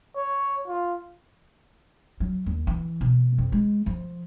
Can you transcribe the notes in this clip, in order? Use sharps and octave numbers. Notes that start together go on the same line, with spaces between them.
C#5
F4
F#3
D#2
E3
B2
F2
G#3
F3